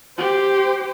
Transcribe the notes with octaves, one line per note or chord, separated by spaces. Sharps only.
G4 C5